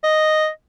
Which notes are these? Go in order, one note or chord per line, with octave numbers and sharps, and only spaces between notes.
D#5